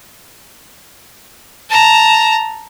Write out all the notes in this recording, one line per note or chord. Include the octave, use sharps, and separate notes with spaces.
A5 A#5